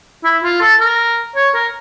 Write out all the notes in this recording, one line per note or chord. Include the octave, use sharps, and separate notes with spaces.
E4
F4
A4
A#4
C#5
A#4